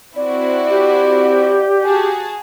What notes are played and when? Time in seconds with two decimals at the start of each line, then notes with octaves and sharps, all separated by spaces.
0.16 C4 E4 F#4 D5
0.69 G4
1.84 F#4 G#4 A5